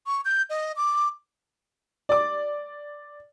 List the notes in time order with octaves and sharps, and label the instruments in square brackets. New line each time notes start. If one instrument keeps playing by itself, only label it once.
[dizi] C#6
G6
D#5
D6
[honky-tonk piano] D5 D6